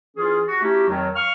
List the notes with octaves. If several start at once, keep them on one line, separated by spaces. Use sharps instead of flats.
E3 C#4 E4 F4 G#4
F#4
A3 C#4 D#4 E4 F#4 G4
F2 D#3 F#3
F5 C#6 F6